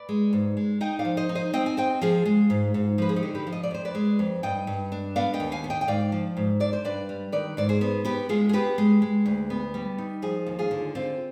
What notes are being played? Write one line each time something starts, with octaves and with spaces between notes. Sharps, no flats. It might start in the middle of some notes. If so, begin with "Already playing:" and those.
Already playing: B4 D5
G#3
G#2
G#3
D#4 D#5 G5
D5 F5
F3
C5 D#5
D#4
C5 D#5
C4 D#5 G5
G#5
C4 D#5 G5
F3 F4 G#4
G#3
G#2
G#2
F3 B4
G#4
D#4 G4
D3
G4 B4
F3
D#5
D5
F2 C5
B4 D5
G#3
F2
G2 D#5 G5
G2
D4
B3 D5 F5
D#5 G5
D#2
F5 G#5
B3
D#5 G5
G5
G#2 D5 F5
F3
G#2
D4 D5
C5
G2 B4 D5
G3
D#3 B4 D5
G#2 D5
G#4 C5
B3
B3 G4 B4
G#3 F4 G#4
G#4
B3 G4 B4
G#3
G#3
D2
B3
G3
D#4
F3 F4 G#4
D#2
F4 G#4
D3
C4 F4